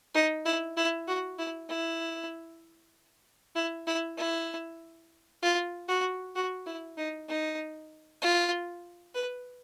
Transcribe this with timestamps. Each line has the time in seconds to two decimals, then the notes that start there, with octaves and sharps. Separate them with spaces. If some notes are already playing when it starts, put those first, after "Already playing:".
0.15 D#4
0.45 E4
0.77 E4
1.08 F#4
1.39 E4
1.69 E4
3.55 E4
3.87 E4
4.18 E4
5.42 F4
5.88 F#4
6.35 F#4
6.67 E4
6.97 D#4
7.29 D#4
8.22 F4
9.15 B4